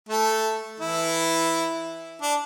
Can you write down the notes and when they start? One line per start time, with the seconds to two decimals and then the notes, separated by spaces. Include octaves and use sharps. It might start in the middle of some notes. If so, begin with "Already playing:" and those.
0.09 A3 A4
0.80 E3 E4
2.22 D4